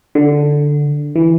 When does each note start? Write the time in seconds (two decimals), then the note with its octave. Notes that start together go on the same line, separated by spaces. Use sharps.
0.15 D3
1.16 E3